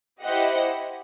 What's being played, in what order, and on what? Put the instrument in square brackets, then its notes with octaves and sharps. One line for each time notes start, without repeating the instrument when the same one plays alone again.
[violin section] E4 G4 C5 D#5 F#5